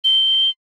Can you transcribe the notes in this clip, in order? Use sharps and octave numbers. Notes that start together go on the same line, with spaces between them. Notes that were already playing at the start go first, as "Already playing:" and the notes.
G7